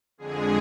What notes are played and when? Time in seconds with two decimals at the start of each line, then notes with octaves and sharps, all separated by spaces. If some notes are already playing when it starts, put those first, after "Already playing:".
0.18 F2 D3 G#3 G#4